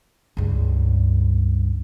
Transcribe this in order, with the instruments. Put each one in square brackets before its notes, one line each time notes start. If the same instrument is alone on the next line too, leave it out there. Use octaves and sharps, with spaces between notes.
[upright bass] C#2 G2